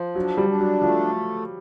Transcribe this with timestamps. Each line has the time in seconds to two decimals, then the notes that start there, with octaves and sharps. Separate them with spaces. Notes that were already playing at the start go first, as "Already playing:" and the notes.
Already playing: F3
0.15 F#3 D4
0.37 G3
0.48 D4
0.60 F#3
0.81 F3 A3